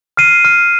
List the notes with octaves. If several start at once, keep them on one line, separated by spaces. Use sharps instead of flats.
F6 C7 D#7
F6